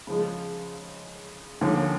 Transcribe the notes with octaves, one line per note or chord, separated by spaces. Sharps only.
C#3 F3 G#3
D#2 D3 F3 A#3 C#4